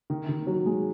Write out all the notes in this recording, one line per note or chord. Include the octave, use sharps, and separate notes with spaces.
D#3
D#3
F#3
G#3